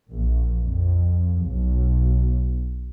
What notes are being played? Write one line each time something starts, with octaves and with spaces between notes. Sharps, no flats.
A#1
F2
B1